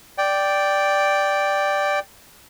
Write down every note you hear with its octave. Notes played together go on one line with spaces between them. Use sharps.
D5 G5